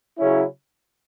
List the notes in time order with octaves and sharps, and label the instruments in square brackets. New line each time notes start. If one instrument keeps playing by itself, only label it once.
[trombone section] C#3 F#3 C#4 E4